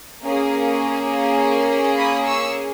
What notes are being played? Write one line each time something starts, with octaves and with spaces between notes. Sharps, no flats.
A#3 C#4 G#4
B5 D#6
C#6 E6